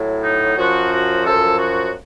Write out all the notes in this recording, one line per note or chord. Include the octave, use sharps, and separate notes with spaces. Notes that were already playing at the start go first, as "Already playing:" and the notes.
Already playing: A2 F#3
D#4
F#2 F3 F#4
F#4
F#2 F3 A4
F#4